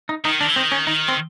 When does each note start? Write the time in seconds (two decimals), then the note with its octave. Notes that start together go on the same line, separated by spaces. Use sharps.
0.09 D#4
0.25 D#3 D#4
0.41 D#3 D4
0.49 E3
0.56 D#3 C4
0.72 C#4
0.87 D#3 D#4
1.08 C4